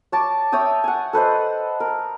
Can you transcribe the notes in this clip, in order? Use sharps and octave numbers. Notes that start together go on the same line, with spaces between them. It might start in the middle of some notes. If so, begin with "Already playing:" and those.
C#5 A5 D6
C#5 E5 G5 D#6
F#5 G#5
A4 B4 C5 D#5
A#4